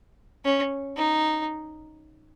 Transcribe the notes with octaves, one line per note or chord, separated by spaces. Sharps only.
C#4
D#4